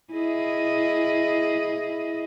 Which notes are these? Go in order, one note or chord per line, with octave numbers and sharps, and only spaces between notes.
E4 G#4 D#5